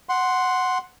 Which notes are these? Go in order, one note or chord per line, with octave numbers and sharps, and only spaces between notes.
F#5 C6